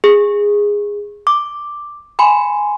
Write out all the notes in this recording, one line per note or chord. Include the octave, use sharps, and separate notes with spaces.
G#4
D6
G#5 B5 C6